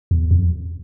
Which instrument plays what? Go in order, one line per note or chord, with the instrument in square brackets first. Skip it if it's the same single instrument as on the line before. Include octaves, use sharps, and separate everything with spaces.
[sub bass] E2
F2